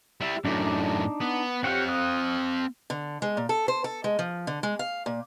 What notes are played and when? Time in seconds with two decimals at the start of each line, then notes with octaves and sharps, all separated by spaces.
0.21 G3 E4
0.45 F#2 A2 D4 D#4 D5
1.21 B3
1.64 C4 G4 C#5 F5 F#5
1.89 D#6 F#6
2.90 D3
3.22 G#3
3.37 A#2
3.49 A4
3.68 C5
3.84 A4
4.04 G#3
4.19 F3
4.47 D3
4.63 G#3
4.79 F5
5.06 A#2